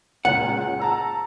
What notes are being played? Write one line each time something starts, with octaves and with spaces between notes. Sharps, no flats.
C#2 A#2 F#5
A5 A#5 E6